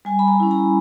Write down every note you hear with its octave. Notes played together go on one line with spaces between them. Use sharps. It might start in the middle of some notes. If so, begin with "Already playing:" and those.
G3 G#5
B5
A#5
C#4 E4
A#5